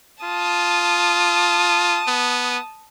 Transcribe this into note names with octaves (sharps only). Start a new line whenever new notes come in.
F4 A5 D#6
B3